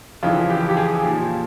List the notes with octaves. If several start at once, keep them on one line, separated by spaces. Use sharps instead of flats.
F2 C#3 E3 F4
G4
G4
G#4
A#2 F3